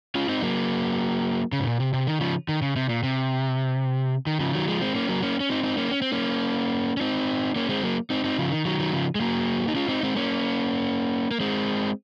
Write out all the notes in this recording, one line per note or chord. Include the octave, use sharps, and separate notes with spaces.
C#4 F4
C4 D#4
F#3 A#3
C#3
G#2
A#2
C3
C3
D#3
C#3 F3
D#3
C#3
C3
A#2
C3
D#3
C#3 F3
D#3 F#3
F3 G#3
G#3 C4
A#3 C#4
F#3 A#3
A#3 C#4
C#4
C4 D#4
C4 D#4
A#3 C#4
C#4
C4
A#3 C#4
C#4
C4 D#4
A#3 C#4
G#3 C4
F#3 A#3
C4 D#4
C4 D#4
C#3 F3
D#3
D#3 F#3
D#3 F#3
C#3 F3
G#3
F#3 A#3
D#4
C#4 F4
C4 D#4
G#3 C4
A#3 C#4
A#3
G#3 C4